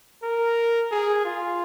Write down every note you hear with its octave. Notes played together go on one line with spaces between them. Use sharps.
A#4
G#4
F4